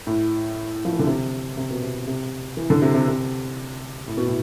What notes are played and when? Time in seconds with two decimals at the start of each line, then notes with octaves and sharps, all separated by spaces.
0.07 A2
0.85 F3
0.93 E3
0.99 D3
1.07 C3
1.57 C3
1.70 B2
1.82 C3
2.07 C3
2.57 E3
2.70 D3
2.82 C3
2.95 C3
3.08 C3
4.08 A2
4.17 B2
4.26 A2